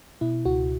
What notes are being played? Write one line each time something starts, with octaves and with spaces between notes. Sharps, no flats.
B2 E4
C#2 F#4